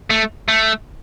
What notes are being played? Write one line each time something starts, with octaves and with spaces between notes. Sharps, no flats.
A3
A3